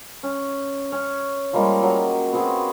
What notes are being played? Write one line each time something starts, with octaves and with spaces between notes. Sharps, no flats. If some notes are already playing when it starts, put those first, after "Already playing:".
C#4
C#4
F3 G3 G#3 A#3
F#3
B3 C4 F#4 G#4